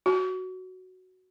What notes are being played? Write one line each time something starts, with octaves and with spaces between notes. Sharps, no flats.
F#4